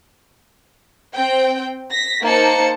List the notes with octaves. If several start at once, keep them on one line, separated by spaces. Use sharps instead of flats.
C4 G5
A#6 B6
A#3 D#4 C5 A5 C#7